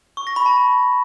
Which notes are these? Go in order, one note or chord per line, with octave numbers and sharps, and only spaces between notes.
C#6
A#6
B5
A5